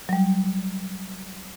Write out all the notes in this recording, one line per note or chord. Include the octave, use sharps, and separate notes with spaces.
F#3 G3